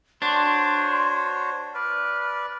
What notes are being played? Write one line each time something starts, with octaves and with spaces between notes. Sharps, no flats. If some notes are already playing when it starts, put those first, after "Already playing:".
D4 F#4 C5 C#5 C6
B4 D5 F6